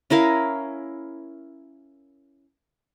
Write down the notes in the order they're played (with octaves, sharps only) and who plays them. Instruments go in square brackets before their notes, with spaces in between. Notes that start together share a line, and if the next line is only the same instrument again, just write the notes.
[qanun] C#4 E4 A#4 F5